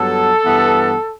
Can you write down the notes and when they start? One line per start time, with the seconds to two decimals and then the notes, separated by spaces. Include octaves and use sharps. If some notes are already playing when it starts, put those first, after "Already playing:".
Already playing: G2 F#3 B3 A4
0.45 G2 E3 B3